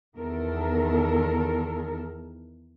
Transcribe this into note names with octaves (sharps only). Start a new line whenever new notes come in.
E2 D#3 A4 A#4